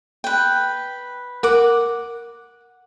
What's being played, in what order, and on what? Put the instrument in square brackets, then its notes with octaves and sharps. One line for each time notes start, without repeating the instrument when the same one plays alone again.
[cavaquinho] B4 G5
[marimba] A#4 [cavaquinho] F#5 D6